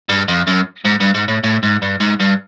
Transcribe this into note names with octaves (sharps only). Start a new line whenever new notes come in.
G2
F2
F#2
G#2
G2
G#2
A2
A2
G#2
G2
G#2
G2